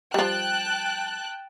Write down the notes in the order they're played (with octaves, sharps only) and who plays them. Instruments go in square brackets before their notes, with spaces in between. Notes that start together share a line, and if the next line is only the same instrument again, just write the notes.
[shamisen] F3 G3 [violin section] G5 A5 F#6